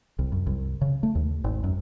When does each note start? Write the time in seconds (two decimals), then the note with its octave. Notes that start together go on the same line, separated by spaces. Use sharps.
0.19 C2
0.32 F#2
0.47 C2
0.81 C#3
1.03 A3
1.15 D#2
1.44 G#1
1.64 F#2